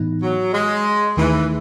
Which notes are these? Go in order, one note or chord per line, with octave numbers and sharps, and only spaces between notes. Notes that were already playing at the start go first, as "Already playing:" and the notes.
Already playing: A2 E3 B3 D#4
F#3
G#3
D#2 D#3 E3 A3 D#4 G#4